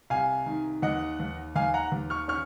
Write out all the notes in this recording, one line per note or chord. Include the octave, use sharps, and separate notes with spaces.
C2 F5 G#5
D#3
D#2 D#5 F#5
D#2
D#2 F5 G#5
F#5 A#5
D#2
C#6 F6
C#4 C#6 F6